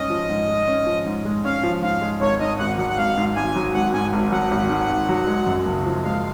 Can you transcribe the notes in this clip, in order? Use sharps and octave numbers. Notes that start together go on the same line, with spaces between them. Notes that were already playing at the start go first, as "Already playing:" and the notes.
Already playing: G#2 G#3 C#4 D#5
F3
G#2
G#3
C#4
F3
G#2
G#3
C#4 F5
F3
G#2 F5
G#3
G#1 C#5
G#2 D#5
G#1 F#5
F#3 F#5
F#5
G#1 F5
G#2
G#1 G#5
F#3
G#1 F#5
G#2 G#5
G#1
F#3 F#5
G#1
G#2
G#1
F#3
G#3
F#2
F#1
F3
G#3 F5